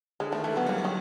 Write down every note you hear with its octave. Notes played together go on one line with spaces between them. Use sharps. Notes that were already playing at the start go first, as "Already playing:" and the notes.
D3 G#3
D#3 A3
E3 A3
F#3 B3
G3 A#3
F#3
D#3